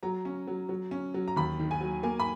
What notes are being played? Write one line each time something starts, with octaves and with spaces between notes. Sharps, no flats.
F#3 A#5
C#4
F#3
F#3
C#4
F#3
A#5
D#2 B5
D#3
G#5
F#3
A#3 G#5
B5